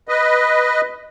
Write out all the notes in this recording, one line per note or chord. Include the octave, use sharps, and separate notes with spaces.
B4 D#5